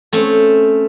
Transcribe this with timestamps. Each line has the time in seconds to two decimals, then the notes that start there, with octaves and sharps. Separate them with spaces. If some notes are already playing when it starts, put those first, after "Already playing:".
0.13 A3 C4 C#4